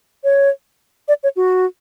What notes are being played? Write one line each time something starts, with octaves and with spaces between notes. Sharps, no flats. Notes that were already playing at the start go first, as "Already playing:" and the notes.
C#5
D5
C#5
F#4